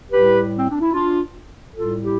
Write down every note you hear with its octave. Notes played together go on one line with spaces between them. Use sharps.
A2 G3 G4 B4
C4
D4
E4
D4 F4
A2 G3 F4 A4
E4 G4